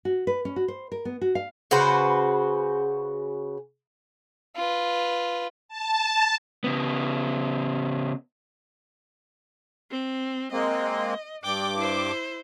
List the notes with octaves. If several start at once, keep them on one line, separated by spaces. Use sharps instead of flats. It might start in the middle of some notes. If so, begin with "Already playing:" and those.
F#4
B4
C#4
F#4
C5
A#4
B3
F#4
F5
C#3 F#4 B4 C5
F4 B4
A5
C#3 B3
C4
G#3 A#3 C4 D#5
G2 D5 G5 D6
E4 C5